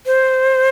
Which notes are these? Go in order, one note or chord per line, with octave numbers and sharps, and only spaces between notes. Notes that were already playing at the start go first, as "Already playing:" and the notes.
C5